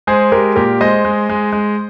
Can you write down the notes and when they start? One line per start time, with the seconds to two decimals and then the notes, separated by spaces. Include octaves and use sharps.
0.07 G#3 G#4 C5
0.32 G#3 G4 A#4
0.56 A#2 G4 A#4
0.81 G#3 C5 D#5
1.05 G#3
1.29 G#3
1.53 G#3